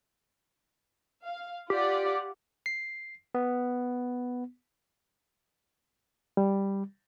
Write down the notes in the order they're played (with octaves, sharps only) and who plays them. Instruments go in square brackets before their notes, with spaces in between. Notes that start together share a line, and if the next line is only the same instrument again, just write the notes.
[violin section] F5
[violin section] F4 D5 F#5 [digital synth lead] G4
[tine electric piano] C7
B3
[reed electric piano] G3